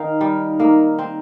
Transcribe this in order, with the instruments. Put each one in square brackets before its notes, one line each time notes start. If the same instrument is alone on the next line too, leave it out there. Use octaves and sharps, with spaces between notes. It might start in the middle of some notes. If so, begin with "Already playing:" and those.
Already playing: [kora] D#3 [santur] D#4 A#4 F5
[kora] G3
[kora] A#3 [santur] D#4 A#4 F5
[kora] C4